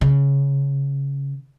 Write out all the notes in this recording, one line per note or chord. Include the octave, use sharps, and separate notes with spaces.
C#3